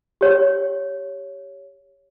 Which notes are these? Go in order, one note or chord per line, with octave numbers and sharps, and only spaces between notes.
G4 C#5